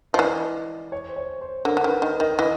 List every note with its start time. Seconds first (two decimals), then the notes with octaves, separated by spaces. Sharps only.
0.13 F3 D#5
0.19 E3 D5
0.92 C#5
1.09 C5
1.16 C#5
1.41 C5
1.65 D3 A#4
1.77 D3
1.84 D#3 B4
2.02 D#3 D#5
2.20 D#3 D#5
2.38 E3 D#5